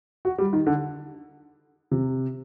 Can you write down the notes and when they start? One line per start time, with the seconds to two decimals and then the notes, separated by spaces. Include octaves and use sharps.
0.25 F#4
0.38 G3
0.53 D#3
0.67 D3
1.91 C3